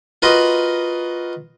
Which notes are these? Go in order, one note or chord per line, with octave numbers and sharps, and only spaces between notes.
F4 F#4 A#4 B4 D#5